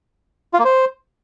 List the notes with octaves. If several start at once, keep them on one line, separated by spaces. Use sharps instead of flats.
F4
A#3
C5